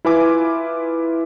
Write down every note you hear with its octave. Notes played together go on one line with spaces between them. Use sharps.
E4 F4 B4 G#5 D6